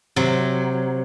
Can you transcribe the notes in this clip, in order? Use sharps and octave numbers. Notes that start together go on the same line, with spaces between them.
C3 F#3